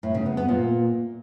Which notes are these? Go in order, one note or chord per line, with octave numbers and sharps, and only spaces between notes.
A2
C#3
B3
B3
A#2